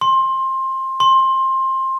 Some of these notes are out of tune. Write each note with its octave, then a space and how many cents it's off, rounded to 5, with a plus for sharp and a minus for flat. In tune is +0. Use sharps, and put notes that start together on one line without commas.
C6 +20
C6 +20